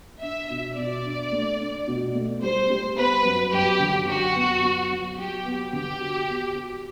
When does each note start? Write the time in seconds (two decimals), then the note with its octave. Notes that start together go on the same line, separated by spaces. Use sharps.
0.22 D4 E5
0.50 B2
0.77 B2 D5
1.05 D4
1.32 A3
1.60 D4
1.87 B2
2.15 A3
2.42 G3 C5
2.70 G3
2.97 B3 B4
3.25 F#2
3.53 F#2 G4
3.80 D3
4.07 F#2 F#4
4.35 B3
4.63 F#3
4.90 F#3
5.18 F#3 G4
5.45 B3
5.72 D3 G4
6.00 F#4
6.28 B3
6.55 F#4